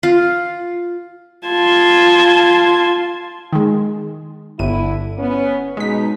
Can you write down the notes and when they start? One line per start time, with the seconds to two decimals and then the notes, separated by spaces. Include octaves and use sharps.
0.03 F4
1.47 F4 A5 C6 G#6
3.53 D#3 G#3
4.59 G1 D3 E4 D#7
5.18 B3 C#4
5.77 B2 G#3 D#4 B6